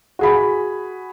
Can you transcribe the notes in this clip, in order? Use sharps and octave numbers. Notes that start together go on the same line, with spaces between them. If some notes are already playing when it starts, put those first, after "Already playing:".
F#4 G#4 B5